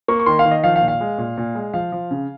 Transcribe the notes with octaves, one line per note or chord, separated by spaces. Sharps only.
A#3 C#6
C#6
D#3 C6
F5
D#3
D#5
F3 F5
F5
A#2
F5
G#3
A#2
A#2
G#3
F3 F5
F3
C#3